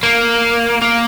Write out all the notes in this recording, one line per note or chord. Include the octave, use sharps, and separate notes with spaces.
A#3
A#3